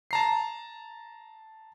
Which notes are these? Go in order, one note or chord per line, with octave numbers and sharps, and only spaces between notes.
A5 A#5 C7